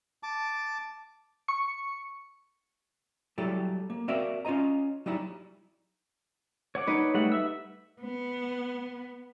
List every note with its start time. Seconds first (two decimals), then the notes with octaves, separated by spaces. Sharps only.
0.23 A5 D6
1.48 C#6 C#7
3.38 F#3 G3 E4 G4 A4
3.90 A#3
4.08 C4 F#4 A#4 D5 E5 F5
4.45 C#4 F4 C#5 D#5 A#5
5.06 F#3 G3 D#4 E4
6.75 C#5 F#5 D6
6.87 D#4 B4
7.14 G3 A3 F#5
7.32 E5 E6
8.01 B3